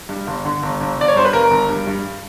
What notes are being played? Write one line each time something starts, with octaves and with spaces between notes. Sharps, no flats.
G2
G1
D3
G1
G1
G1 D5
C#5
G2 C5
B4
G1 A#4
G1
G2
G2